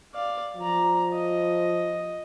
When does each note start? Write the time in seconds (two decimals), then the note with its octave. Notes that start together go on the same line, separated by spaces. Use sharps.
0.14 D5 F5
0.57 F3 D5 A#5
1.13 D#5